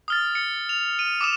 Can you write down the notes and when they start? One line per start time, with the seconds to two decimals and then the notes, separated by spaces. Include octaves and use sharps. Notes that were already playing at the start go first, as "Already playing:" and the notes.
0.08 D#6 F6 A6
0.35 C#7
0.69 F7
0.99 D#7
1.21 D6 D#6 E7